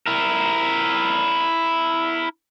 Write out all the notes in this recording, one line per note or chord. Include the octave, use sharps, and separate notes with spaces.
E4 A#4